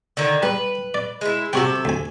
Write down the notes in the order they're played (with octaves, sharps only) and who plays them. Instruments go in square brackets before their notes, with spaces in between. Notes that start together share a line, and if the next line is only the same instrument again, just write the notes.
[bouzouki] D3 D#3
[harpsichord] G3 [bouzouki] B4
[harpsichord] D5
[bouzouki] G#3 E4
[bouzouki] C3 A4 [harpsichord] F#4 C#5 G5
[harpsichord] D2 G#5